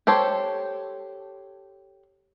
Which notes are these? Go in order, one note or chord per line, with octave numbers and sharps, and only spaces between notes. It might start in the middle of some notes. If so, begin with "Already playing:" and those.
G4 A4 C5 C#5